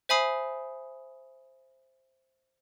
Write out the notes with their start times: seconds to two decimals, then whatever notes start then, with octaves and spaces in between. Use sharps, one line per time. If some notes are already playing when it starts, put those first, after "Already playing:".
0.09 C5 E5 G#5 B5 D#6 C7